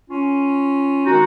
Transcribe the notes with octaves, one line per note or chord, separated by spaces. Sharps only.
C#4 F4
D#3 G#3 C4 D#4 F#4